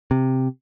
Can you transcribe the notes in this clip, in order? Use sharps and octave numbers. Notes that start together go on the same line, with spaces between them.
C3